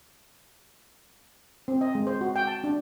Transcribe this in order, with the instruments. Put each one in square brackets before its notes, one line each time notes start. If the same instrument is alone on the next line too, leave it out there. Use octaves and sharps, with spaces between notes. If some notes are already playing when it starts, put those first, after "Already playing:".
[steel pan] C4
D#5
G#3
C5
F#4
G5
A5
D4